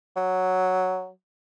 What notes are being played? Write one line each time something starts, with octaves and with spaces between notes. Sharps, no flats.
F#3